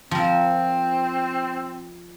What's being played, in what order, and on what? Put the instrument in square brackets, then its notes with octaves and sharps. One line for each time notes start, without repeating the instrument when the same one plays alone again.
[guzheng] F3 A#4 [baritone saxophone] C4